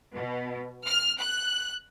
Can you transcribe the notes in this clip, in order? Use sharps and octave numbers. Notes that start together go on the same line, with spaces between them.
B2
F6
F#6